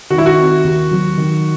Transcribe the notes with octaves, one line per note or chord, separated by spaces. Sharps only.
D#3 F#4
E4
F#4
C4
D#2
F#3
D#3